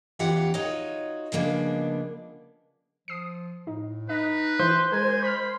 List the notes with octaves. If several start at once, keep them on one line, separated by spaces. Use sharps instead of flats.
E2 E3 C#4 F4 G4 F#5
D#4 F4 F#4 C#5 D#5
C#3 F3 G#3 A#3 B3 D4
F3 D#6 C7
A2 D#4
D#4 B4 D#5
E3 E4 C5
G#3 G#4 A#4 G#5
B5 C6 F6